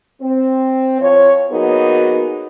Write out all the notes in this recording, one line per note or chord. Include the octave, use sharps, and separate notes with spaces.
C4
F3 C#5
F#3 A#3 B3 D#4 F#4 G#4